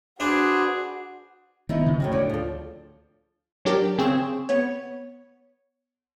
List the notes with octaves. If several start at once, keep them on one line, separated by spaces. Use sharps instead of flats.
D4 F#4 G#4 B4 C5 D5
D#3 B3 D#4 E4
C#3
A2 D#3 F#4
D2 C#5 D5
F3 A4
F#3 D4 G4 A#4 D5
C#3 C4 G#4 C#6 E7
B3 C#5